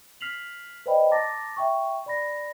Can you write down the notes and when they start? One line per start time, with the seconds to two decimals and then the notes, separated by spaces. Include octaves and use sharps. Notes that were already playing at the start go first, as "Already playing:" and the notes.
0.21 F6 B6 C7 F7 F#7
0.86 B4 C5 D5 D#5 G5 B5
1.11 A5 A#5 D6 A6 A#6
1.57 E5 G5 C#6
2.06 D5 B5 A#6